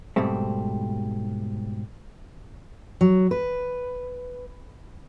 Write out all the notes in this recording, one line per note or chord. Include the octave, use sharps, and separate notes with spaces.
G#2 B2 G3 A3 C4
F#3
B4